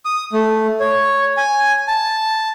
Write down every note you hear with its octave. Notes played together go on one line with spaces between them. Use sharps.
D#6
A3
C#5
G#5
A5